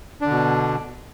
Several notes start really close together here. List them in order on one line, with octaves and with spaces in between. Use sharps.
D4 D3 B2